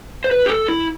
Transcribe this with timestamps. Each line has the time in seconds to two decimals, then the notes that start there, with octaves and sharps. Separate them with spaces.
0.24 C5
0.31 B4
0.46 G4
0.49 A4
0.68 E4